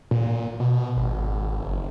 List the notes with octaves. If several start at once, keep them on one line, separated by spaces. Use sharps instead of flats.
A#2
B2
G#1
F#1